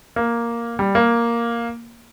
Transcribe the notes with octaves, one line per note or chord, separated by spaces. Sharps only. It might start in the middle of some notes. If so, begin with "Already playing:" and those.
A#3
G3
A#3